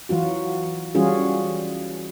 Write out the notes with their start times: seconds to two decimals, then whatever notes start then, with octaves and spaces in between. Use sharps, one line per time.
0.09 E3 F#3 F4 F#4
0.95 E3 G3 C#4 F4 F#4 G#4